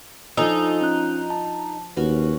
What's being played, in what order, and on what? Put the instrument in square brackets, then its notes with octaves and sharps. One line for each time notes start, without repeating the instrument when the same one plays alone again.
[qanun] F3 D4 F4 [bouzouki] D#4 [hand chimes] A4 G#5 E6
[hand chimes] C#4 F#6
A5
[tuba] D#2 [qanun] C#4 F#4 [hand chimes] B4